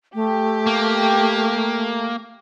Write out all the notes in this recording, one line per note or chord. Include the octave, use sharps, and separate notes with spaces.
A3 G4
A#3